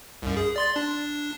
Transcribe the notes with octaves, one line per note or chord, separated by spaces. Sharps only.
C2 F#2
G#4
D5 C6 A6
D4